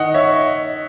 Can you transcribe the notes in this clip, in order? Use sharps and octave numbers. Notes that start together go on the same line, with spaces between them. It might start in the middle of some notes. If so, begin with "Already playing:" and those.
Already playing: D#3 D#5 F#5
C#5 E5